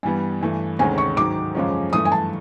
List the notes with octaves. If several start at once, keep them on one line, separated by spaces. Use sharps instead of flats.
G2 E3 G3 B3 G#5
G2 E3 A3
D2 C3 D#3 G#3 C#4 G#5
C#6
G#2 D#3 F#3 D6
F#2 C#3 F3 G#3 C#4
G2 E3 A3 D#6
G#5
A5